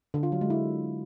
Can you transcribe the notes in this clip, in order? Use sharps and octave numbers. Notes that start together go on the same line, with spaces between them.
D3
F4
F#3
G#3
E4